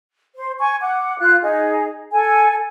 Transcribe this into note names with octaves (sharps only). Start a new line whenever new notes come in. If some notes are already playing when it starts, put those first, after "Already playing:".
C5
G#5 C#6
F#5 D6
F4 F#6
D#4 G#4
A4 G#5